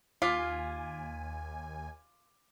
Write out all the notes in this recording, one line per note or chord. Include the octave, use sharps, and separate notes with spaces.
D#2 F4 G#5 D6 F6 B6